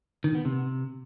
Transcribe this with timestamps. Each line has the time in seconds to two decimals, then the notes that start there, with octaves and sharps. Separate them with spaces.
0.24 D#3
0.35 B3
0.45 C3